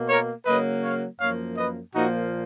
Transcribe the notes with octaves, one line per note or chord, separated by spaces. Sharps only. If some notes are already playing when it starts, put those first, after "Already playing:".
Already playing: B2 A#3
A#4 C#5
C#3 F#3 A#3 B4 D#5
C#5 F5
F#2 F3 A#3 C#5 F5
B4 D#5
A#2 F3 A#3 D#4 F#4